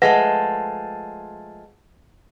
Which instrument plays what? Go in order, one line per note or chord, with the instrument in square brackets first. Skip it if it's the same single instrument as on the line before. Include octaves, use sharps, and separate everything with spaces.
[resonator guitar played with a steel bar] F3 G#3 A3 [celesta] B4 F#5 A#6